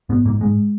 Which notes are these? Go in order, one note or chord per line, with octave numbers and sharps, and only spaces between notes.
G#2 B3
G#2 A#3
G#2 G#3